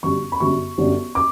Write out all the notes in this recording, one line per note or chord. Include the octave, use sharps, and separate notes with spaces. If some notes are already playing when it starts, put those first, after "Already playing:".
G1 F#2 D3 G3 C#6
B5
G1 F#2 D3 G3 C#6
G1 F#2 D3 G3
D6